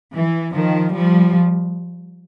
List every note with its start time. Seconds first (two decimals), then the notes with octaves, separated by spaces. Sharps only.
0.14 E3
0.54 D#3 F3
0.94 F3 G3